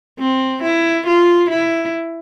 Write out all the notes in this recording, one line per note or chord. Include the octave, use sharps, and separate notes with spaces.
C4
E4
F4
E4